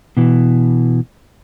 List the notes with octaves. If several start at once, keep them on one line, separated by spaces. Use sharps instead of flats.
B2 E3